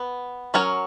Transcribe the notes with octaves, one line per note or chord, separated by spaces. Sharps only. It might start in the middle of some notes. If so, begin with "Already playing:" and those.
Already playing: B3
F#3 C#4 F#4 A#4 C#5